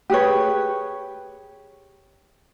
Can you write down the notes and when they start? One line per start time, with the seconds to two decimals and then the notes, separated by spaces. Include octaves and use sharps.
0.10 G4 G#4 B4 C#5